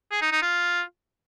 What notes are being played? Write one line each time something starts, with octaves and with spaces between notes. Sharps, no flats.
G#4
D#4
D#4
F4